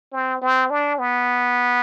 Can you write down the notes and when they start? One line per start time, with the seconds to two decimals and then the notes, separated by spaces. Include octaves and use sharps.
0.13 C4
0.42 C4
0.70 D4
0.99 B3